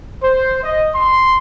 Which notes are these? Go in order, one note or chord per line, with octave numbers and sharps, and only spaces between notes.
C5
D#5
C6